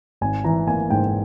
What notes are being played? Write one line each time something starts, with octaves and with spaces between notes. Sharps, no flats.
G#1 G#5
E3 A#5
A#3 G#5
G#2 G5